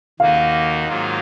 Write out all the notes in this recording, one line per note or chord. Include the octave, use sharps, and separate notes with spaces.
D#2 D#3 A#3 D#4 F#4 F5
G#2 D#3 F#3 A#3 F4